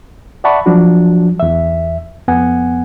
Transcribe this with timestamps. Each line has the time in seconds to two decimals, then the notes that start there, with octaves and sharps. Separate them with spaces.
0.44 D5 E5 F#5 A5 B5 C#6
0.66 F3 F#3 D4 F#4
1.40 E2 E5
2.28 F2 B3 F#5 G#5